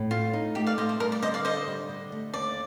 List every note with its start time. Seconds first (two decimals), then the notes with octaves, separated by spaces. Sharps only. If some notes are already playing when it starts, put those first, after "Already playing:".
Already playing: A2
0.11 A3 F4
0.33 D#4
0.55 A3 G4
0.67 D5 F5
0.78 A3 C5 D#5
0.89 C5
1.00 G3 A#4
1.12 D5
1.22 D3 C5 D#5
1.34 D5 F5
1.45 A4 C5 D#5
1.67 G3
1.89 D3
2.12 A3
2.34 D#2 D5